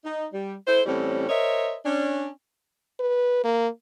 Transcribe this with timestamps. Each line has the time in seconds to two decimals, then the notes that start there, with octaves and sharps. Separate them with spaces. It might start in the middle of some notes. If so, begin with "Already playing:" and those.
0.04 D#4
0.33 G3
0.67 E4 A4 C5
0.86 A2 E3 G3 C4 C#4
1.29 A#4 C5 C#5 D#5 E5
1.85 C#4 D4
3.00 B4
3.44 A#3